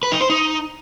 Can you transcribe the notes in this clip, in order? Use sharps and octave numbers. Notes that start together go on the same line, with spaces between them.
B4
D#4
C5
D#4